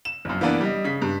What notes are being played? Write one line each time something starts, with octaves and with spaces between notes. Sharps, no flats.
E7
A#1 F#2
E3 A#3 B3 D4
G3 D#5
C#3 B6
G2